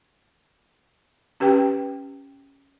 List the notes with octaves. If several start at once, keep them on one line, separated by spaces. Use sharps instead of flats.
C#4 G4 B4 G5